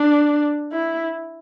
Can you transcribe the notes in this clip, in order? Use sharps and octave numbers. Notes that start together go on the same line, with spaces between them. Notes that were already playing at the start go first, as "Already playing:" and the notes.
Already playing: D4
E4